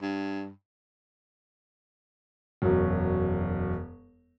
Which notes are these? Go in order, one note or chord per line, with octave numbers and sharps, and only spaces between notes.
G2
E1 F#2